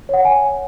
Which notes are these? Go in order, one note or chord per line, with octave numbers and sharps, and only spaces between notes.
C#5 F#5
G#5